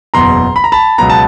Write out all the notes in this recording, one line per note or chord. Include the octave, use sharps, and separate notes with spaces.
F#1 E2 B2 A#5 C6
B5
A#5
A5 B5
C#2 B2 F#3 B3 A#5
A5